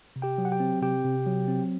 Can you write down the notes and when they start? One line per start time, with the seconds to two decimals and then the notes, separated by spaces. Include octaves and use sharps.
0.16 C3
0.22 G4 G5
0.38 F#3
0.45 F#5
0.52 G4 G5
0.60 C4
0.81 C3 G4 G5
1.05 C3
1.26 F#3
1.48 C4